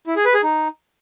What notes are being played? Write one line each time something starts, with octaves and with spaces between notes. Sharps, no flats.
E4
G#4
B4
G#4
D#4